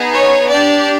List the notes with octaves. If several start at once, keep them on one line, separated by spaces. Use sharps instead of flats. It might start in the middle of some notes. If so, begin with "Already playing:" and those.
Already playing: B3 D#4 G#4
C#5
D4 G4 D5